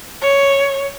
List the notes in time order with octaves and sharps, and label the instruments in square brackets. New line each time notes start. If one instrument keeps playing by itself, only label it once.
[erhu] C#5